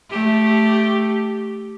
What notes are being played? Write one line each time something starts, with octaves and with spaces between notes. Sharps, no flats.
A3 G4